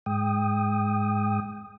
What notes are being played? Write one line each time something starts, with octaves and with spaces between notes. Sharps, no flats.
G#2 G#3 G5 D#6